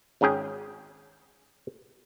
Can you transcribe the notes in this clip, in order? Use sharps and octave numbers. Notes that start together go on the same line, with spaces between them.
G#1 G#2 C#4 G#4 G5